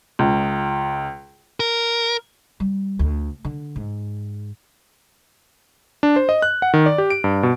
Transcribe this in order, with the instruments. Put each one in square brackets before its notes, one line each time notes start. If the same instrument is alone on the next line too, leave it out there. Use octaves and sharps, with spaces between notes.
[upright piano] C#2
[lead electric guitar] A#4
[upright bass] G3
D2
D3
G#2
[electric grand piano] D4
C5
D#5
F#6
F#5
D#3
D5
G4
D7
G2
B2